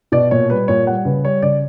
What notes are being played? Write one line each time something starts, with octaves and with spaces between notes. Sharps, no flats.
B2 D5
A#2 C#5
G3 B4
A#2 C#5
G3 F#5
C#3 B4
G3 C#5
C#3 D5